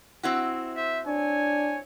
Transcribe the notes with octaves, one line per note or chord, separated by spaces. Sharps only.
C4 E4 F#4
C5 E5
D4 C#5 G#5